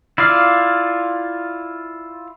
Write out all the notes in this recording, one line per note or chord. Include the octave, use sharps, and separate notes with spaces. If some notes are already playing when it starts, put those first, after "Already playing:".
E4 F4 D5 F5